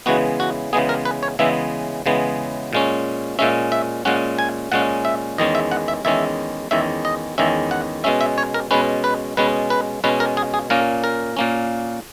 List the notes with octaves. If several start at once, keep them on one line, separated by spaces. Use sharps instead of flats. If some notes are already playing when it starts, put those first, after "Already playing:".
C#3 E3 G#3 B3 F#4
F#4
C#3 E3 G#3 B3 G#4
A#4
B4
C#5
C#3 E3 G#3 B3 E5
C#3 E3 G#3 B3
A#2 G#3 C#4
A#2 G#3 C#4 E5
E5
A#2 G#3 C#4 F#5
G#5
A#2 G#3 C#4 F#5
E5
E2 D#3 G#3 C#4 D#5
E5
F#5
E5
E2 D#3 G#3 C#4 E5
E2 D#3 G#3 C#4 E5
D#5
E2 D#3 G#3 C#4 E5
F#5
B2 G#3 C#4 E5
E5
C#5
A#4
B2 G#3 C#4 B4
B4
B2 G#3 C#4 B4
B4
B2 G#3 C#4 B4
A#4
G#4
G#4
A#2 A#3 C#4 A#4
A#4
A#2 A#3 C#4